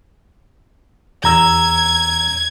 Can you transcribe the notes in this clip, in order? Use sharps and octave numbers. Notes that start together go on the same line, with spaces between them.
E2 A#5 E6 G#6